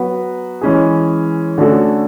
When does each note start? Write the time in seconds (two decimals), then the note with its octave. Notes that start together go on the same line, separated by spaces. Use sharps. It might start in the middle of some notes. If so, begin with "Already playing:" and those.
Already playing: F#3 B3 F#4 B4
0.61 E3 G#3 C#4 G#4
1.58 D3 A3 C#4 F#4 A4